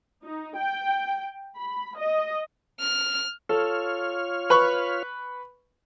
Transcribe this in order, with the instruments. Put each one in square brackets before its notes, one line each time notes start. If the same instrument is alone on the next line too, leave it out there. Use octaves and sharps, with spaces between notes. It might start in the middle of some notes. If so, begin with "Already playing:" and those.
[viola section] D#4
G5
B5
D#5
[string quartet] F6
[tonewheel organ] F4 C#5 F6 [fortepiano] A4
[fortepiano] B4 B5 C#6